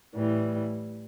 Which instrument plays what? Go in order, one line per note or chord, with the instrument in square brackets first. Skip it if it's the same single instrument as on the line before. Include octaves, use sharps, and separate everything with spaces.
[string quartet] A2 E3 G3